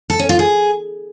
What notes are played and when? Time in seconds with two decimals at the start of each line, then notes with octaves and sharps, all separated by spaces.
0.10 A4
0.19 C#4
0.29 F4
0.39 G#4